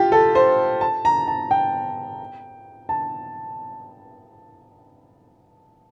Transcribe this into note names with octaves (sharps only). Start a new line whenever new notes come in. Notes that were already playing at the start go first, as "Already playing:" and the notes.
Already playing: F4 G4
A4
C5
A5
A#5
A5
G5
A5